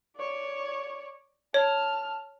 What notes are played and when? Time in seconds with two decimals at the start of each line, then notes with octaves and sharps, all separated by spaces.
0.16 C#5 D5
1.54 C#5 A5 F6